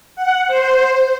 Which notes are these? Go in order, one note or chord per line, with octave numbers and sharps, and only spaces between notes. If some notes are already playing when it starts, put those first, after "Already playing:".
F#5
C5